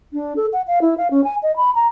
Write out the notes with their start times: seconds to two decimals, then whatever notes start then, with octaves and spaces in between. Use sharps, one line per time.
0.13 D4
0.36 A4
0.53 F#5
0.68 F5
0.81 E4
0.98 F5
1.11 C#4
1.24 G#5
1.43 D#5
1.56 B5
1.75 A#5